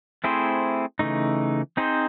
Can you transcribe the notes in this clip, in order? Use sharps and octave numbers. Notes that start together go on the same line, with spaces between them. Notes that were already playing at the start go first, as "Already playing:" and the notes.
A3 C4 E4 G#4 C5
C#3 E3 A3 D#4
C4 D#4 G#4 C5